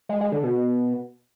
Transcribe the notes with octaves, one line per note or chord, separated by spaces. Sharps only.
G#3
G#3
D3
B2